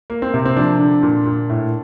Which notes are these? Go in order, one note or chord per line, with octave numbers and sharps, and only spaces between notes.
A#3
C4
C3
C4
F3 D4
D3
A#2
A#2
A2